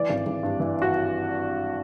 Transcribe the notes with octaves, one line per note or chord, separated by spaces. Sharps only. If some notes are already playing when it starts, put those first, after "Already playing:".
Already playing: E3 D5
G#1
G#1
G2
E3
F#4